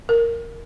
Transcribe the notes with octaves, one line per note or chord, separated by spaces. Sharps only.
A#4